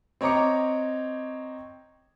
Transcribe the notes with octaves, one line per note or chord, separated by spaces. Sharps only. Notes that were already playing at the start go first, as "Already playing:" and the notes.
C4 C#5 D#5 A#5 D6 C#7